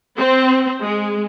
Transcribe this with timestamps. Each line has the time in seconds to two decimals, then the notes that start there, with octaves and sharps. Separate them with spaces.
0.18 C4
0.82 G#3